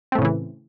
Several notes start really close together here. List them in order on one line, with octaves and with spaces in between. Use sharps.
C4 A3 A2 C#3 E3